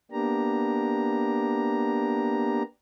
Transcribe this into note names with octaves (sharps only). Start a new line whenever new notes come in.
A#3 B3 D4 G4 A#5